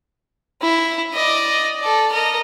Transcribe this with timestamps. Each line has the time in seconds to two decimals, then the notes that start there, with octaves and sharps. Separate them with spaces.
0.61 E4
1.14 D5 D#5
1.80 A4 D5
2.12 A#4 D#5